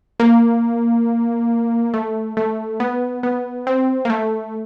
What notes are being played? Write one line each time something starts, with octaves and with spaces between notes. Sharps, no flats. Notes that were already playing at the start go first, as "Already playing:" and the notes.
A#3
A3
A3
B3
B3
C4
A#3
A3